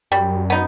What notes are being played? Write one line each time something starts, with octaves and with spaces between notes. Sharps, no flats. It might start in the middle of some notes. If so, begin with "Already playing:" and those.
F#2 G3
B3 D#4